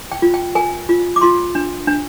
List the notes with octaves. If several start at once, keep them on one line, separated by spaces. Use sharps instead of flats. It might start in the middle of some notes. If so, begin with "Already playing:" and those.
G5
F4
G5
A#4 G#5
F4
D6
F4 C6
D4
D4